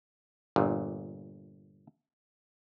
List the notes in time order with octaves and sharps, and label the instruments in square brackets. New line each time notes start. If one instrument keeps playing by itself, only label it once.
[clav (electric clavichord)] G1 A#2